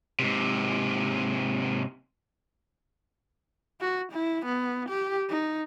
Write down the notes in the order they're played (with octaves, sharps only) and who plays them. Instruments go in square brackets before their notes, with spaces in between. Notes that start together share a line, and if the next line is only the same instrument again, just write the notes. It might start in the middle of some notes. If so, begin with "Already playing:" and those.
[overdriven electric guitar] G#2 C3
[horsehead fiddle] F#4
E4
B3
G4
D#4